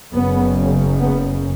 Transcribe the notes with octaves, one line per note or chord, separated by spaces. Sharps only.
F#1 F#2 C#3 B3
B3